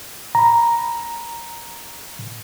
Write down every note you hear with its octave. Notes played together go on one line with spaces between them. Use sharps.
A#5 B5